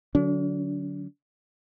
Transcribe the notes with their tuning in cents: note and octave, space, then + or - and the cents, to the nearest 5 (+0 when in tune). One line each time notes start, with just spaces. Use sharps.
D3 +0 F#3 +0 D4 -45